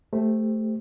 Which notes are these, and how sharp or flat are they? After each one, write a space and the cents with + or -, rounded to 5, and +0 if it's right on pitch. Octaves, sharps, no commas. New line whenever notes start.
A3 +0 G4 +15 C5 +0